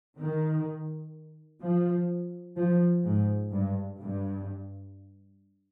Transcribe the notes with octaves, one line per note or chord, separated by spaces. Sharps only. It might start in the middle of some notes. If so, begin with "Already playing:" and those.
D#3
F3
F3
G#2
G2
G2